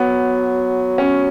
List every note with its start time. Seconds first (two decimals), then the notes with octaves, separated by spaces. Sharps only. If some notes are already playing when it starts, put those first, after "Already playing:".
Already playing: F#3 B3
0.98 C#4